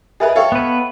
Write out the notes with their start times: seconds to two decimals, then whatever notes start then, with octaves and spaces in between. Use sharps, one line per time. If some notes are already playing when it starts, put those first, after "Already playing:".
0.20 G#4 A#4 B4 D#5 E5 B5
0.36 A4 C#5 E5 F5 G5 C#6
0.52 B3 B4